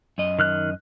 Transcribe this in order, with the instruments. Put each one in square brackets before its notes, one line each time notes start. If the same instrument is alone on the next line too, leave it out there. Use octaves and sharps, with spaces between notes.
[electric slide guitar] F#2 D#5
[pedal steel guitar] D#3 F6 F#6